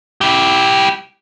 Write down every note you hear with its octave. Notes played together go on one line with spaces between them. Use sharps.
E4 G4